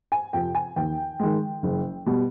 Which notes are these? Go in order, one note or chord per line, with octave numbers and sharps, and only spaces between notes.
G#5
F2 C3 F3 G5
G#5
D#2 G5
D#3 G#3
F#1
B2 G3